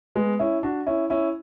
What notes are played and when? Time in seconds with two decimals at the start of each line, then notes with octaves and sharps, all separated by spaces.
0.15 G#3 B3
0.39 C#4 E4
0.63 D4 F#4
0.87 C#4 E4
1.10 C#4 E4